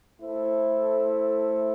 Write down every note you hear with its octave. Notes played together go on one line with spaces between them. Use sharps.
A3 E4 A4 C5